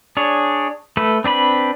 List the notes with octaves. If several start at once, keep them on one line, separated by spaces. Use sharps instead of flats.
D4 G#4 C#5
A3 A4 B4
C4 D4 B4 B5